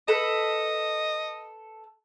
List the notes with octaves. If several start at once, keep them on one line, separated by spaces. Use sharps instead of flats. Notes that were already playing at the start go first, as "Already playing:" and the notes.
A4 B4 D#5